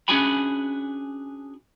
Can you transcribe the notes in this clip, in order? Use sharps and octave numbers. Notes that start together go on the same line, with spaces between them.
C#4 D4 F#4 G#4 G#5 B5